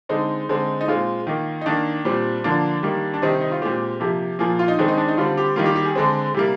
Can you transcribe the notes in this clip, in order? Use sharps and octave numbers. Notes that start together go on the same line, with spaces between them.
D3 G#3 C4 D#4
D3 G#3 C4
D#4
A#2 G#3 C4 F4
D#3 A#3
D#4
D#3 A#3 D4
A#2 G3 C4
D3 F3 A#3 D4
D#3 G3 A#3
D4
C3 D#3 G3 C4 D#4
D#4
F4
A#2 G#3 C4 G4
C3 F3 A#3
A#2 F3 A#3 G#4
F4
D#4
D#3 G#3 C4 D4
D#4
D4
D#4
D3 G3 C4 F4
G4
D#3 G3 A#3 F4
G4
G4
G#4
D3 G#3 C4
C3 G3 A#3